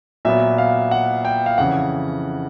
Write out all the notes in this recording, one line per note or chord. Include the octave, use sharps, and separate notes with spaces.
A#2 F#3 B3 E5
F5
F#5
G5
F5
F2 C#3 E3 F#5